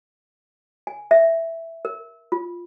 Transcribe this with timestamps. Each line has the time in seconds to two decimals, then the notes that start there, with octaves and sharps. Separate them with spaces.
0.87 G#5
1.11 E5
1.85 A#4
2.32 F4